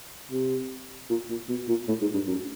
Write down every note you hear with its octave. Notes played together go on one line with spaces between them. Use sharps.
C3
A#2
A#2
B2
A#2
A2
G#2
G2
F#2